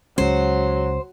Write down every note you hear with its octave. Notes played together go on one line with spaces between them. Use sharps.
C#2 F#3 G#3 C#4 C5